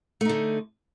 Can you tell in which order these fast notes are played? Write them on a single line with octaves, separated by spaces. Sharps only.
A3 D#4 D3